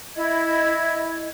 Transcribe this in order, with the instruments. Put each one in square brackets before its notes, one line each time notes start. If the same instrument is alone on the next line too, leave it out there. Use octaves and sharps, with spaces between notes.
[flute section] E4 D#5 G#6